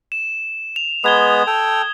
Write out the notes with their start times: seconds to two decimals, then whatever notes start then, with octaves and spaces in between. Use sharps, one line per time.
0.12 E7
0.76 F7
1.04 G#3 B3 B4 D#6 G#6 G7
1.47 A4 G5